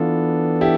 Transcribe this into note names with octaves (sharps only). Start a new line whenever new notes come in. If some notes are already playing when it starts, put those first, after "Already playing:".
Already playing: E3 B3 D4 F4 A4
E4 G4